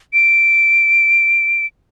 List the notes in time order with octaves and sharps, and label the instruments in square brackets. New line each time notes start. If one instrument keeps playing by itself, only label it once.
[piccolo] D7